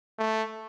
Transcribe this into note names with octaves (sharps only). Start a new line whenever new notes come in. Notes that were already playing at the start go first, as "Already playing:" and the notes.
A3